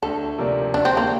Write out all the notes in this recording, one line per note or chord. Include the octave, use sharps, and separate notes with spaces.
D2 A4
C3 F3 A#3 D4
D2 D4
C4
A#3